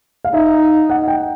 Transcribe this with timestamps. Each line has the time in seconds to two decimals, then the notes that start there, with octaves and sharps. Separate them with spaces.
0.25 F5
0.34 D#4 E5
0.90 F#5
1.08 G5